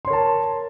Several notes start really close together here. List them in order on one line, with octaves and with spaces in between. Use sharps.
C6 C#5 A#4 A5